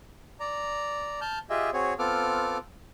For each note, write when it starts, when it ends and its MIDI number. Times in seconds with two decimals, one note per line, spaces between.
0.40 1.20 74
0.40 1.20 82
1.21 1.39 81
1.21 1.39 89
1.21 1.39 91
1.50 1.70 65
1.50 1.70 67
1.50 1.70 68
1.50 1.70 75
1.50 1.70 76
1.73 1.94 60
1.73 1.94 66
1.73 1.94 68
1.73 1.94 73
1.99 2.58 59
1.99 2.58 60
1.99 2.58 65
1.99 2.58 69
1.99 2.58 86
1.99 2.58 89